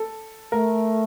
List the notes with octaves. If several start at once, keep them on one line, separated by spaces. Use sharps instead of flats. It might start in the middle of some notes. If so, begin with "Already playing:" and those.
Already playing: A4
A3 A#4